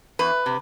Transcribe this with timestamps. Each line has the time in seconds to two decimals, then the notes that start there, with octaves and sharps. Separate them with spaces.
0.19 E2 B4
0.46 C3